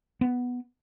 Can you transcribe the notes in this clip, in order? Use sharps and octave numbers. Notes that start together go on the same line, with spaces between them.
B3